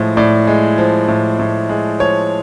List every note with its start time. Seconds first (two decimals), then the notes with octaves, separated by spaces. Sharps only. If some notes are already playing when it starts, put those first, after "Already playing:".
Already playing: A2 F3 G#3
0.17 A2 D5
0.47 G#3
0.78 F3
1.08 A2
1.39 A2
1.69 G#3
2.00 F3 C#5